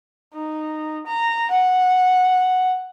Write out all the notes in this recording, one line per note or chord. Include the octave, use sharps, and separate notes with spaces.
D#4
A#5
F#5